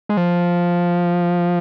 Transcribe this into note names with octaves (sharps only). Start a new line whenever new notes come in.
G#3
F3